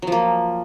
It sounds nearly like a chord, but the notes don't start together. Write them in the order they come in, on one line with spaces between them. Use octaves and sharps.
F#3 F3 A#3